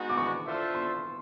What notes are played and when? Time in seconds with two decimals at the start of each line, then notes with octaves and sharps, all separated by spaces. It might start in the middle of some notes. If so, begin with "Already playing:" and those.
Already playing: G#3 B3 D#4 F#4
0.09 D6
0.17 C#6
0.46 D4 F4 A4 C5 E5
0.75 C6